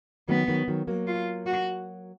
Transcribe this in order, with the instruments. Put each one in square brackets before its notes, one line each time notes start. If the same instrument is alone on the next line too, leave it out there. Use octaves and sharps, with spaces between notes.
[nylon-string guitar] D#3 F#3 [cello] B3
[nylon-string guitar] D#3 F#3
D#3 F#3
F#3 A#3
[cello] F4
F#4